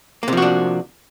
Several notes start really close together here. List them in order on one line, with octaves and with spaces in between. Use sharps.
A#3 C3 F3 F#4 D4